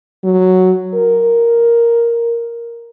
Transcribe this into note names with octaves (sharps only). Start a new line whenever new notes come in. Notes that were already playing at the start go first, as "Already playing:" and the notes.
F#3
A#4